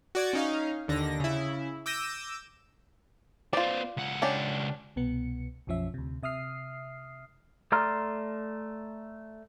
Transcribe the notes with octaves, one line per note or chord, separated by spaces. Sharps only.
F#4 D5 G#6
C#4 D#4 F5
D#2 D3 A#6
C#3 E4
D6 E6 G6 A#6 D#7
B3 F4 C5 D5
C#2 F#5
C#4 D4 G4
C2 B2 B3 C#7
B1 F#2 F3 C#4 E5
D2 C3
C3 E5 D#6 F6 C7
A3 D5 A#5 C6 F6